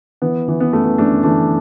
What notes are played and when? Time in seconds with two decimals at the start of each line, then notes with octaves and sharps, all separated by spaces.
0.22 E3 B3
0.48 E3
0.60 B3
0.73 F#2 A3
0.84 B3
0.98 F#2 A3 D4
1.23 E3 A3 D4